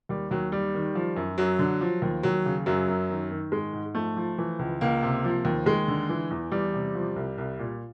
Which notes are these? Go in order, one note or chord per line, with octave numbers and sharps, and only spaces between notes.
D#2 G3
D#2 F#3
D#3 G3
D#3
F3
F#2
F#2 F#3
D3
F3
D#2
D#2 F#3
C#3
F#2 F#3
F#2
D#3
D#3
G#2 G#3
G#2
F3 A3
F3
E3
C#2
C#2 A#3
C3
F3
D#2
D#2 G#3
D3
E3
E2
E2 G3
C3
F3
C2
C2
A#2